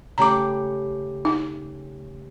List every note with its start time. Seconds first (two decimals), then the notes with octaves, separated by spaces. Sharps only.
0.18 C#3 A3 G4 A#5 D6
1.25 D#4